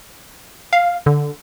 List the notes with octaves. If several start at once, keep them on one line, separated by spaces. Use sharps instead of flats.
F5
D3